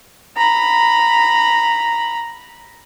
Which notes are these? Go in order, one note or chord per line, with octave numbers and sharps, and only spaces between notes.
A#5 B5